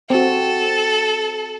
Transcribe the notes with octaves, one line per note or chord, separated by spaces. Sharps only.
C4 F#4 A4